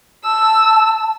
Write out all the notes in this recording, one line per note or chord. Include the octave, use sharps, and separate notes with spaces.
A5 E6